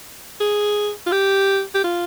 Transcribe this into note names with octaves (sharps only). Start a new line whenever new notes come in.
G#4
F4
G4
G4
F4